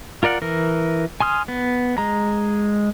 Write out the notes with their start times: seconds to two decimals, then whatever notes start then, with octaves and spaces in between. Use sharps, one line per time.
0.23 F4 A#4 D5 F#5
0.42 E3 A#4
1.20 G#5 C6 D#6 F6
1.48 B3
1.98 G#3 A#5